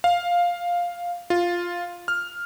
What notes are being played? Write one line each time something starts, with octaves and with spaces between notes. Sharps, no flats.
F5
F4
F6